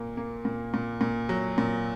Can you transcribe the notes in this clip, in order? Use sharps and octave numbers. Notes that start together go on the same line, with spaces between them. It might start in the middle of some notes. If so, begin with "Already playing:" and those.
Already playing: A#2 A#3
A#3
A#2
A#2
A#2
F#3
A#2